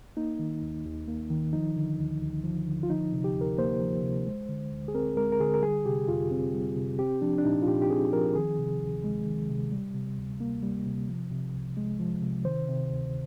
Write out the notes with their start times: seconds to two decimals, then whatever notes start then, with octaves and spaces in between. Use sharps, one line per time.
0.17 A#3 D#4
0.39 D#3
0.62 D#2
0.85 D#2
1.08 A#3
1.30 D#3
1.53 F3 D#4
1.76 D3
1.98 D2
2.21 D2
2.44 F3
2.67 D3
2.83 F4
2.90 F3 D#4
3.12 C3
3.24 G4
3.35 D2
3.41 A#4
3.58 A#3 C5
3.81 F3
4.03 C3
4.26 G#3
4.49 D3
4.72 D2
4.88 G#4
4.94 C4 A#4
5.17 G#3 A#4
5.32 A#4
5.40 D3 G#4
5.54 A#4
5.62 G3 G#4
5.86 C3 G4
6.08 F2 F4
6.31 C4
6.54 G3
6.77 C3
6.99 C4 G4
7.22 F3 D4
7.38 D4
7.44 A#2 D#4
7.62 F4
7.67 A#2 G4
7.82 G4
7.90 C4 G#4
8.13 F3 A#4
8.35 D#3 G#4
8.58 C3
8.82 D2
9.04 G#3
9.27 D#3
9.49 C3
9.72 G3
9.95 C3
10.17 D2
10.40 A#3
10.63 G3
10.86 C3
11.08 F3
11.31 C3
11.54 C2
11.77 G#3
11.99 F3
12.22 C3
12.45 D#3 C5
12.68 C3
12.91 D2